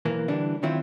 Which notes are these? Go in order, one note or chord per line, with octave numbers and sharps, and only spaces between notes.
B1 E3 A#3
D3 E3 G3 D4
D#3 F#3 C4 E4 F4 C5